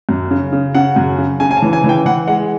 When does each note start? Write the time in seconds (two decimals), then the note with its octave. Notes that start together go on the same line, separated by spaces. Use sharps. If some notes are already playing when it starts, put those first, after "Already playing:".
0.09 F#2
0.31 C#3
0.52 C#3
0.75 C#3 F#5
0.96 F#2
1.18 C#3
1.40 C#3 G#5
1.51 G#5
1.57 A5
1.62 E3
1.73 G#5
1.84 E3
1.89 G5
2.06 E3 F#5
2.27 G#3 F#5